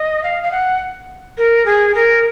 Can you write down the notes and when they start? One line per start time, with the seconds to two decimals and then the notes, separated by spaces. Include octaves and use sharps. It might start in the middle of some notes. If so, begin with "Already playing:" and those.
Already playing: D#5
0.23 F5
0.43 F5
0.52 F#5
1.38 A#4
1.66 G#4
1.95 A#4